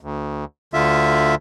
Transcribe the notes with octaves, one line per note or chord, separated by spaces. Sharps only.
D2
D2 D3 F4 E5